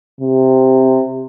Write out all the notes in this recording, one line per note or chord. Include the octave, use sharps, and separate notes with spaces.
C3